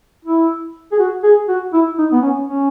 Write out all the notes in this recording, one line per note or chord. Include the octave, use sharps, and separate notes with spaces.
E4
G#4
F#4
G#4
F#4
E4
D#4
B3
C#4
C#4